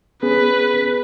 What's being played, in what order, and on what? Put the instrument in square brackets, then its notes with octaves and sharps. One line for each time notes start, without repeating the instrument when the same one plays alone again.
[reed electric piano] B3 C#4 G#4 [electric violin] B4